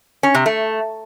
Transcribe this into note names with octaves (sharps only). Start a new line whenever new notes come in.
C#4
C3
A3